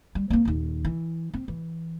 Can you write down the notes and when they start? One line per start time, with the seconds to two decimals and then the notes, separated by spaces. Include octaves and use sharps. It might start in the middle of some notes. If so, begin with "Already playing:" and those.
0.15 G3
0.30 A#3 C4
0.45 D#1 D#2
0.85 E3
1.34 C4
1.48 E3